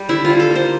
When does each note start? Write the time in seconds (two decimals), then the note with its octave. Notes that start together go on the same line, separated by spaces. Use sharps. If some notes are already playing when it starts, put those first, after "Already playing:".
Already playing: G3
0.09 D3 E4
0.25 F4
0.30 G3
0.40 A4
0.50 A#3
0.55 C5